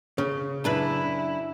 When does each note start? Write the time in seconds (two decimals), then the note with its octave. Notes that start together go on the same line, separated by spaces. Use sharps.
0.18 C#3
0.64 F#2 D4 E4 B4